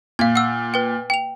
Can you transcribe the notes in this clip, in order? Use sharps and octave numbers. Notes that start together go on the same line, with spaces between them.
A#2 F5 G#6
F#5 E6
B4 G5
G5 F7